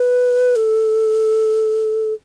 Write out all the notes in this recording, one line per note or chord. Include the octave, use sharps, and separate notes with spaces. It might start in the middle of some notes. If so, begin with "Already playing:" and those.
Already playing: B4
A4